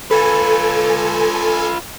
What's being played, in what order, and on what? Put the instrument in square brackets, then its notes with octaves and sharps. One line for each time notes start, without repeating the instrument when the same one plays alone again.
[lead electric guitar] F4 B4 [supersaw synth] A4 G#5